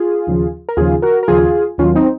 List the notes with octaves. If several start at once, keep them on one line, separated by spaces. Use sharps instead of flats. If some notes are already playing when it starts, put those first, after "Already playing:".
Already playing: F4 G#4
D#2 C#3 F3
A#4
D#2 C#3 F3 F4 G#4
F#4 A#4
A#4
D#2 C#3 F3 F4 G#4
D#2 D#3 F#3 C#4 F4
C4 D#4